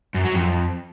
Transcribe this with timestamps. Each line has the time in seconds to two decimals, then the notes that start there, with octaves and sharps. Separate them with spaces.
0.14 F#2
0.24 F#3
0.34 F2